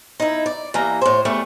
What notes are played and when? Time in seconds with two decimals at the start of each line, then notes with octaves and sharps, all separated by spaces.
0.20 D#4 E4
0.46 D5
0.74 E3 G3 A#3 A#5
1.02 A2 C5
1.25 E2 G3 A3